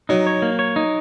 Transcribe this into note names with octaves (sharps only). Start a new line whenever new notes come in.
F#3 D#4
C#5
A#3
C#5
D#4